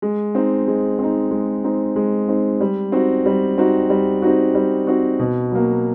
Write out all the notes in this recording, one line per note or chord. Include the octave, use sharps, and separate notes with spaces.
G#3
C4 D#4
G#3
C4 D#4
G#3
C4 D#4
G#3
C4 D#4
G3
C4 D#4 F#4
G3
C4 D#4 F#4
G3
C4 D#4 F#4
G3
C4 D#4 F#4
B2
F#3 A#3